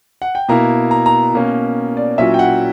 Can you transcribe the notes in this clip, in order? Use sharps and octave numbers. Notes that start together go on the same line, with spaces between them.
F#5
G5
B2 A#3 E4 A#5
A#5
A#5
B2 A#3 C#4
D5
A#2 F#3 C#4 E4 E5
G5
F#5